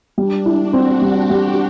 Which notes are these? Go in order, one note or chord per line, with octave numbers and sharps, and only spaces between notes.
G3 D4
E4
F#4
C4
G3 G4
G3